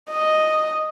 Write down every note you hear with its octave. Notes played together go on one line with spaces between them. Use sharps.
D#5